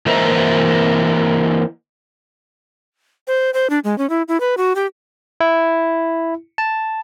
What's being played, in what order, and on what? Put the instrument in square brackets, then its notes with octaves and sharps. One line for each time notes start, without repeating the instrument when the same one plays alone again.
[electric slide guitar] E3 A#3 C5 D#5 E5 A#5
[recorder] C5
C5
D4
G#3
C#4
E4
E4
B4
F#4
G4
[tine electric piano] E4
A5